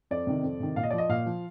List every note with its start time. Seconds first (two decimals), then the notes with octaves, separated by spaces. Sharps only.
0.11 F2 D5
0.27 C3 D#3
0.43 F2
0.60 C3 D#3
0.76 A#2 F5
0.83 D#5
0.91 D5
0.93 F3
0.98 D#5
1.09 A#2 F5
1.26 F3